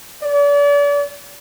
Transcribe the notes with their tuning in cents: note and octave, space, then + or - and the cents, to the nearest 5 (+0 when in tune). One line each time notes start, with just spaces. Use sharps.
D5 -40